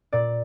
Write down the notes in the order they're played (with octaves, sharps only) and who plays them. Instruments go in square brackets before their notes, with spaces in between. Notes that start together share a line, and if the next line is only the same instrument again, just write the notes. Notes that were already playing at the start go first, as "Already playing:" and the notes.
[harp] A#2 D5